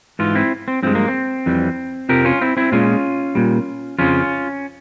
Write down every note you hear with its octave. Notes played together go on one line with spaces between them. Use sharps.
G#2 E3 F4
C4 E4
C4
G2 F3 G#3 C4
A#3
C4
F2 E3 G3
F2 C3 F3 G4 A#4
C#4 F4
C4 E4
C4 E4
A#2 G#3 C#4 F4
A#2 G3
F2 C#3 F3 C#4 F4